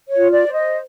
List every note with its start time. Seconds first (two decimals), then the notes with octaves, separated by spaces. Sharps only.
0.09 C#5
0.16 F4
0.31 D5
0.46 C5
0.54 D#5